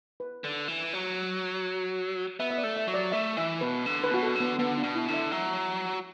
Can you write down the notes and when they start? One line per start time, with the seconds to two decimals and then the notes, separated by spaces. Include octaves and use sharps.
0.20 B4
0.44 D3
0.68 E3
0.93 F#3
2.40 B3 E5
2.50 E5
2.58 D5
2.63 A3
2.77 E5
2.88 F#3
2.94 D5
3.12 A3 E5
3.37 E3 E5
3.61 B2 B4
3.86 D3
4.04 B4
4.11 B2 F#4
4.23 A4
4.35 D3
4.40 B3
4.59 D3 B3
4.78 D4
4.83 B2
4.95 E4
5.08 D3
5.14 E5
5.32 F#3 E5